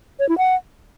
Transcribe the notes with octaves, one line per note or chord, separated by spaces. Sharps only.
C#5
E4
F#5